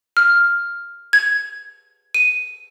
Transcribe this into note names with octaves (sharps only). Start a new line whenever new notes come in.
F6
G#6
D#7